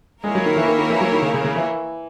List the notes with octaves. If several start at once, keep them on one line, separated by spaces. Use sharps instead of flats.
G#3 A#3 E4 A#4 C#5
F#3
D#3
E3
D#3
D#3
E3
F#3
D#3
C#3
C#3
C#3
E3